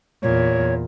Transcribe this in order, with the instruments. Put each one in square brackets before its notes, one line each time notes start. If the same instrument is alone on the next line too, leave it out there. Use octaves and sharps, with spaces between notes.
[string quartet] E2 A#2 [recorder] C#5